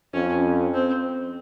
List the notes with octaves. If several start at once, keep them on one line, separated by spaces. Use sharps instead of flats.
F2 C#4
C4